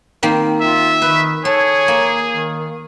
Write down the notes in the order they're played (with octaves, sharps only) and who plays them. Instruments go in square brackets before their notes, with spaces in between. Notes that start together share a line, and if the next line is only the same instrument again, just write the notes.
[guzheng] D#3 A#3 C4
[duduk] F4 [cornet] E5
[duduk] D#3 [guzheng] B4
[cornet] G#4 [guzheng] A4 [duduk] C#5
[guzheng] A#3
[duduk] D#3